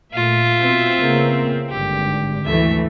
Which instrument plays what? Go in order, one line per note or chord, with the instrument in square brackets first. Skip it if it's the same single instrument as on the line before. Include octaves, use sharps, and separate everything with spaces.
[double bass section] A#2 A3 [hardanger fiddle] F4 E5
[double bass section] B2 [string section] C4
[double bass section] C#3 A#3 B3
[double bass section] G#1 G2 D3 [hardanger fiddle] G4
[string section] D2 E3 A3 [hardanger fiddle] E5